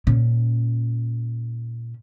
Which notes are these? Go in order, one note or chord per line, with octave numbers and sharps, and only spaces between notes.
A#2 C#4